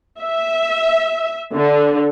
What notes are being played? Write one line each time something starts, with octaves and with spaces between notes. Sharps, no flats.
E5
D3